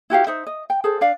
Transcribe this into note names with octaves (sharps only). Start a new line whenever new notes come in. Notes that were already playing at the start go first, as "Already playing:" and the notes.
E4 F#4 G4 F5
D#4 C5 E5
D#5
G5
G#4 A4 C5
D4 D5 F5